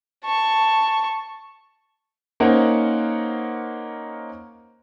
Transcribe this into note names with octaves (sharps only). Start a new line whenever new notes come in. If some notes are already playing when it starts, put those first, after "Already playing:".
A5 C#6
A#3 C#4 D#4 A#4 C5 F#5